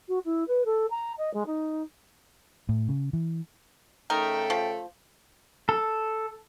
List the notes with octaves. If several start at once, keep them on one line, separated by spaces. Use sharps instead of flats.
F#4
E4
B4
A4
A#5
D#5
G#3
D#4
A2
C#3
E3
C#3 A3 D#4 A#4 G5
F3
A4